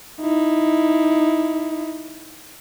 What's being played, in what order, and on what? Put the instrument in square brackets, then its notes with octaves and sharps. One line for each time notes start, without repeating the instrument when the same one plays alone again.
[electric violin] D#4 E4